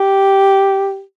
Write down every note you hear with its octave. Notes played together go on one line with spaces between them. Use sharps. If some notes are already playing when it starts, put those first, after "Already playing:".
Already playing: G4